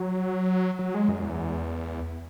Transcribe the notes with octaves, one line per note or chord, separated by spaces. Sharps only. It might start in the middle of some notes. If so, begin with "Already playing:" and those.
Already playing: F#3
F#3
G#3
F#2
E2